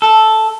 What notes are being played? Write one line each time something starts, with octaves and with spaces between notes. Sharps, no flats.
A4